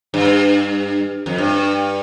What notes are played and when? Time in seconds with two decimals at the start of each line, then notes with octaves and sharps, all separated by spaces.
0.14 G2
1.26 F2
1.38 G2